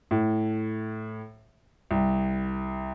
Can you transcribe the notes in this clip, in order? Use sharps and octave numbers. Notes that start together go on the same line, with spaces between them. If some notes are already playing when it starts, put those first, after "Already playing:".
A2
C2